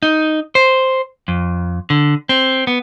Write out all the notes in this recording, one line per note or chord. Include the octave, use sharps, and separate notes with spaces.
D#4
C5
F2
D3
C4
B3